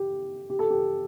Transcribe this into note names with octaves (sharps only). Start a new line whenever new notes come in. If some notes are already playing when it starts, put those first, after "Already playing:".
Already playing: G4
G4
A4
G4